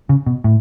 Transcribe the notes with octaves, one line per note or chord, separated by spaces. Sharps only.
C#3
B2
A2